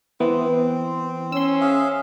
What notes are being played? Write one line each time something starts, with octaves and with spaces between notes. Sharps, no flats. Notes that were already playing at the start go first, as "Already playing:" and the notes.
E3 B3 C4
C#4 C6 E6
G#4 E5 F5